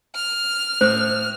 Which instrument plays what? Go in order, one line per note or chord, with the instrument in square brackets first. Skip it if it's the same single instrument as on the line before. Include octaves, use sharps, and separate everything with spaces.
[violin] F6
[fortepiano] A2 [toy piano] C5 D#6